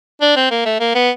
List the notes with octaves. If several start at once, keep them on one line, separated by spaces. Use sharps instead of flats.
D4
C4
A#3
A3
A#3
B3